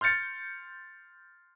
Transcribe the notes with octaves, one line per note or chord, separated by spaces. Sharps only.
C6 F6 G6 A6 C#7